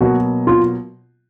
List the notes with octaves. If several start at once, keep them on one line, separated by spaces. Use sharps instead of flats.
B2 F#3 A#3 F#4
F4